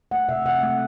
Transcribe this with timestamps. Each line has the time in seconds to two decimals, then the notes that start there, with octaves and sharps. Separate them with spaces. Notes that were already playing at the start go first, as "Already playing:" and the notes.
0.11 A3 F#5
0.29 C3 E5
0.45 C3 F#5
0.63 A3